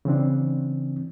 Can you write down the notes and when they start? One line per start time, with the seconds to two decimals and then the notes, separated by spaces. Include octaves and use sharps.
0.05 C#3 E3 C4 D4